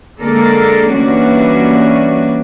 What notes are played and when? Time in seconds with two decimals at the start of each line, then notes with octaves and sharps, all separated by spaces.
0.18 D3 G#3 A#3 D4 A4 A#4
0.92 E3 G3 A#3 C#4 D4 F#4